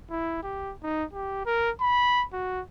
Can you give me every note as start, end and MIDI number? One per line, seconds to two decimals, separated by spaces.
0.10 0.38 64
0.43 0.73 67
0.83 1.04 63
1.13 1.45 67
1.46 1.70 70
1.81 2.24 83
2.33 2.61 66